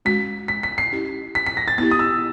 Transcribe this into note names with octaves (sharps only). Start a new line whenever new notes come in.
G#3 C#4 F#4 B6
B6
B6
C7
C#4 E4 G4
B6
B6
A#6
A6
B3 E4 G4 A6
D#6
E6